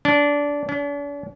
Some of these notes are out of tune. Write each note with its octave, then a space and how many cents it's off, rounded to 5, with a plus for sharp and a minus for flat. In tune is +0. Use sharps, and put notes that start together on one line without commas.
D4 -20
D4 -45